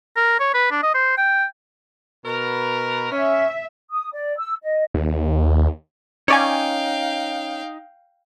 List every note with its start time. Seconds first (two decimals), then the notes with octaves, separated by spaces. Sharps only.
0.17 A#4
0.40 C#5
0.54 B4
0.71 D4
0.83 D#5
0.95 C5
1.18 G5
2.25 B2 A#4 B4
3.11 C#4 E5
3.91 D#6
4.12 D5
4.38 E6
4.62 D#5
4.94 D#2
6.28 C#4 D#4 C#5 D5 F5 G5 G#5